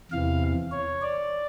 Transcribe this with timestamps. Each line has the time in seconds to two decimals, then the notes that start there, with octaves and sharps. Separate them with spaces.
0.12 E2 C3 E3 F5
0.72 C#5
1.02 D5